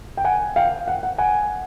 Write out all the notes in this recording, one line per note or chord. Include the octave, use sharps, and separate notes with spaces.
G5
F#5 G#5
F5 G5
F#5
F#5
F#5 G#5